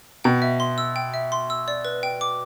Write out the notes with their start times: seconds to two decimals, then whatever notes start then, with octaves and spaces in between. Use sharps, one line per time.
0.24 B2 G5
0.42 E5
0.60 C6
0.78 E6
0.96 G5
1.14 E5
1.32 C6
1.50 E6
1.68 D5
1.85 B4
2.03 G5
2.21 D6